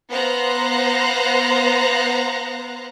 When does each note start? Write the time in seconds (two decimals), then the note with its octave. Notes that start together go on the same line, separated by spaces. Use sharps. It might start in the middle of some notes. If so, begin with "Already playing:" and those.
0.10 B3 C5 F5 A#5 F#6